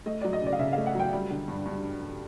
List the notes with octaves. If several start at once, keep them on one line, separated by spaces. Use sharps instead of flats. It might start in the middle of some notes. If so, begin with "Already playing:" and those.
A3 D#5
F#3 D5
D#5
C#3 D5
F5
C#3 E5
A3 F5
F#5
F#3 G5
G3
D3
G2
G2